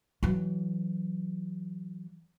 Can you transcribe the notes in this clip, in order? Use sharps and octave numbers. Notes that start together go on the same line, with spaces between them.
E3 F#3